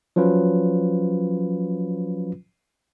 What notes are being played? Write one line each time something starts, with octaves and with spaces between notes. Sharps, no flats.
F3 F#3 C#4 F4 B4